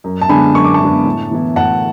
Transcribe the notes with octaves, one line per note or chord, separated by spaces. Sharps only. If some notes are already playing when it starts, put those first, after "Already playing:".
F#2
A5
D3 G#3 B3 D4 G#5 B5
F#2 C#6
D6
A5 C#6
D3 G#3 B3 D4
A2
E3 B3 E4
A2 F#5 A5